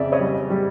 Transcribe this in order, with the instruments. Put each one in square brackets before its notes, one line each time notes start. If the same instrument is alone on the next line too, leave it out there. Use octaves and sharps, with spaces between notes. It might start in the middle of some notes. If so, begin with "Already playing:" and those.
Already playing: [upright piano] F2 C#3 D5 E5
C#5 D#5
G3
G3